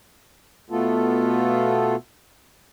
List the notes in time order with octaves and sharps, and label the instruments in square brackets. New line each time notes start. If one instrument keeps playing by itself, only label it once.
[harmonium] B2 A3 B3 F4 A4